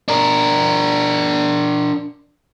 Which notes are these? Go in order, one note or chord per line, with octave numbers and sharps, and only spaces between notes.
D4 A#4